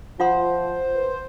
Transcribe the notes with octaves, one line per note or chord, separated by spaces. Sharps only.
F3 F4 C5 F#5 C6
B4